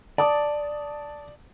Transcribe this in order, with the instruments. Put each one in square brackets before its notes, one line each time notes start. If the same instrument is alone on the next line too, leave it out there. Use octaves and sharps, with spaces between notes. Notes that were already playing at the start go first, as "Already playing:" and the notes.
[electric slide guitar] D5 [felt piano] A5 D6 D#6